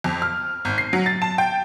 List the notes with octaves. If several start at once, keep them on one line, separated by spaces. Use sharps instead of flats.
F2
F6
G#1
C7
F#3
A6
A5
G5